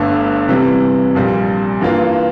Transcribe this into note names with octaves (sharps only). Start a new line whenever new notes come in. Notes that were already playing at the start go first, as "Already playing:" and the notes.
Already playing: G1 G2 D3 A3
C3 E3 G3
A#1 A#2 G3
G2 E3 A#3 F4